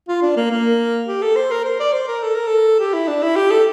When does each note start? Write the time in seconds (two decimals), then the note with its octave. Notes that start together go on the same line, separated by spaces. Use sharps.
0.09 F4
0.22 D4
0.36 A#3
0.51 A#3
1.07 G4
1.22 A4
1.36 C5
1.51 A#4
1.65 C5
1.80 D5
1.93 C5
2.08 A#4
2.22 A4
2.34 A#4
2.47 A4
2.80 G4
2.94 E4
3.08 D4
3.22 E4
3.36 G4
3.50 A4